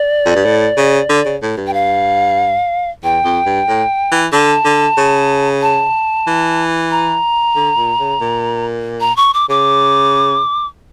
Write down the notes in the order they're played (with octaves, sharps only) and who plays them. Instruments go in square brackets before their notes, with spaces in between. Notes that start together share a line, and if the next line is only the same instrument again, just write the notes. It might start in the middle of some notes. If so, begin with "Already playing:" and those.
Already playing: [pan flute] D5
[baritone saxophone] F2
G2
A2
C#3
D3
C#3
A2
G2
[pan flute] G5
F5
[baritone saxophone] E2 [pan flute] G5
[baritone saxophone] F2
G2
A2
E3
[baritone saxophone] D3 [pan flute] A5
[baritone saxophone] D3
C#3
[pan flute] A5
[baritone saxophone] E3
[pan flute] A#5
[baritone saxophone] D3
A#2
C#3
A#2
[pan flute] A#5
C#6
D6
[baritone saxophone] C#3 [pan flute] D6